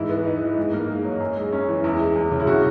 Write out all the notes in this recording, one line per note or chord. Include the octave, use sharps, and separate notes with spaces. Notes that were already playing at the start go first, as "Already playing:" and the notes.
Already playing: G#2 E3 E4
B3
D#4
E3
G#2
A#3
G#2
F#3
F#2
G#3
C#4
E3
E2 E4
G#3
E2
C#3
E4
C#3 F#4